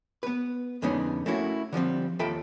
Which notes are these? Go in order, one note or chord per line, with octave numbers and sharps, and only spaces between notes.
B3 B4
F2 D3 G#3 B3 C#4 D#4
A3 A#3 C#4 E4 F#4
D3 F3 G3 C4
D#2 F4 A4 E5 G5 B5